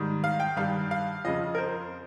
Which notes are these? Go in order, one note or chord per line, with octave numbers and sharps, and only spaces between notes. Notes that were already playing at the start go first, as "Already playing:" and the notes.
Already playing: G#2 D#3 G3
F5
G5
G2 D#3 G3 F5
F5
F2 C#3 F3 D#5
A#4
C5